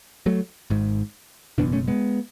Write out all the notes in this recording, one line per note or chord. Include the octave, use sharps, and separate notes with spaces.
F#3 A3
G#1 G#2
F#1 E2 B2 B3 D4
A3 C#4
G#3 B3